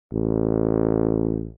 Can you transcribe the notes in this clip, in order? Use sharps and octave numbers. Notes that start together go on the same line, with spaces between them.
A1